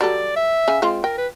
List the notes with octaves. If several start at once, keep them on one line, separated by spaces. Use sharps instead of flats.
F#3 G3 A4 D5
E5
C#3 G#5
G#3 C4 F4
A#4 G5
B4